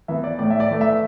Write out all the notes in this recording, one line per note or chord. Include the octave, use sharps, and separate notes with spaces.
E3 B3 E5
D5
A2 D5
E5
D5
E3 A3
E5